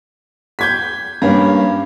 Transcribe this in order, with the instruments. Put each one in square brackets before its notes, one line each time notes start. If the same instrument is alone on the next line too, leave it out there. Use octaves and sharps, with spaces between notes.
[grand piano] G6 G#6 B6
G2 A#3 C#4